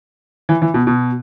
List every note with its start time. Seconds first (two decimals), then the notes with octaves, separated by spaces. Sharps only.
0.49 E3
0.62 E3
0.74 B2
0.87 B2